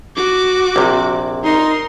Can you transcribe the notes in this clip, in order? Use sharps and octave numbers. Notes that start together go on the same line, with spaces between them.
F#4 D6
A#1 C3
D#4 A#4 C6